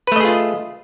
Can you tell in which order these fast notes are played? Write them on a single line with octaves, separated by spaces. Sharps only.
B4 A3 D#5 G#4 F4